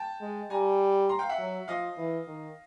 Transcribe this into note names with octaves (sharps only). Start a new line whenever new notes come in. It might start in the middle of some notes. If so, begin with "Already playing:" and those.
Already playing: G5 A5
G#3
G3 G#5 A#5
A#5 C6
F5 G5
E5 F#5
F#3
F3 D#5 F5
E3
D#3